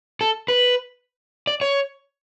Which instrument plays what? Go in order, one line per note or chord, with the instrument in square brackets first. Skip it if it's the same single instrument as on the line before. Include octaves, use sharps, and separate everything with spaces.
[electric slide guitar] A4
B4
D5
C#5